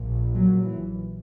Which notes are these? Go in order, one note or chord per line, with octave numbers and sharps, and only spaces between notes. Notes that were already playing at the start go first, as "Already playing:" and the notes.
Already playing: A#1 A#2
F#3
E3